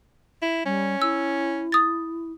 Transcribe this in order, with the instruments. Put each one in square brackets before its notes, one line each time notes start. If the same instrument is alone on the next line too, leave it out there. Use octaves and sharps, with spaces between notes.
[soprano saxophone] E4
[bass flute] G3 [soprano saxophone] C#4
[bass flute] E4 [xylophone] E6
[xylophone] D#6 A6